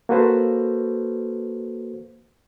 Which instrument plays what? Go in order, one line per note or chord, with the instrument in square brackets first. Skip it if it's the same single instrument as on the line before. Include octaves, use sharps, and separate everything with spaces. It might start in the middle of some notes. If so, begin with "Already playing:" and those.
[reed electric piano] A#3 F#4 A4 B4 C5